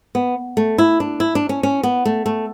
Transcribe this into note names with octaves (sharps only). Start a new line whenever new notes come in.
B3
A3
E4
D4
E4
D4
C#4
C#4
B3
A3
A3